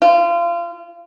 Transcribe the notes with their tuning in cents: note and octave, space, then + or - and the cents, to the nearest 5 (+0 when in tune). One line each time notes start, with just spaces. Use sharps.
F4 -30